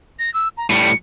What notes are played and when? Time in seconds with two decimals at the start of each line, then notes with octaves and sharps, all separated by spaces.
0.19 A#6
0.34 E6
0.57 A#5
0.70 A2 G3 C#7